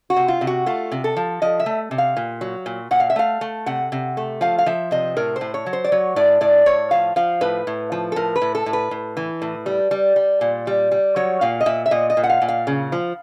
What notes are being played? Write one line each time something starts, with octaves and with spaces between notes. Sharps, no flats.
F#4
C3
F4
C3
F#4
A3 F4
C3
A4
F3
F3 D#5
E5
A3
C3
F5
A#2
F#3
A#2
A#2 F#5
F5
E5
A3 F5
A3
C3 F#5
C3
A3
F3 F5
F5
F3 E5
C3 D#5
A2 A#4
C5
A2
C#5
F#3
C5
D5
F#3 C#5
A2 D5
A2 D5
A2 C#5
F3 F5
F3 F5
A2 B4
A2
F3
A4
A2 A#4
B4
A2
A4
A2
B4
A2
E3
A2
G3
G3
G3
A#2
G3
G3
F#3 C#5
A#2 F5
D#5
A#2 E5
E5
A#2 D#5
D#5
A#2
F#5
F5
A#2
F5
C#3
F3